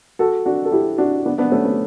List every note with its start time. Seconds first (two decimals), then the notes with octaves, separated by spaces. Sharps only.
0.19 F#4 A4
0.46 D4 F#4
0.65 A4
0.72 E4 G4
0.98 D4 F#4
1.26 B3 D4
1.38 B3 D4
1.52 A3 C#4
1.65 B3